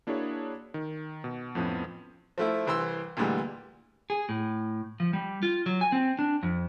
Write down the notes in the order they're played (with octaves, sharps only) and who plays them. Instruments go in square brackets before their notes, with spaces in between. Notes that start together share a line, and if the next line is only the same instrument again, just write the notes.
[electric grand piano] A#3 D4 E4 F#4 G#4 C#5
D#3
B2
F2 A2 F3 B3 C#4
[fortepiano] F3 A3 E4
C2 E3 C5 C6 E6
D2 A#2 D3 E3 G3 G#3
[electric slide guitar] G#4
A2
F3
G3
F4
F#3
G#5
C4
D4
F2